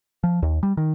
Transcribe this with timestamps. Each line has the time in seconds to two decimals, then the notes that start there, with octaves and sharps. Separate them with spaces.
0.24 F3
0.43 D#2
0.63 G3
0.77 D#3